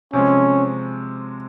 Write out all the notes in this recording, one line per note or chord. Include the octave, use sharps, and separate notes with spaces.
C3 F3 G#3 C#4